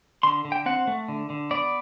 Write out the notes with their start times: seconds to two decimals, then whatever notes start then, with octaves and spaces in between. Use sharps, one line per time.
0.23 D3 C6
0.45 D3
0.52 G5
0.66 C4 F#5
0.87 A3
1.08 D3
1.30 D3
1.51 B3 D5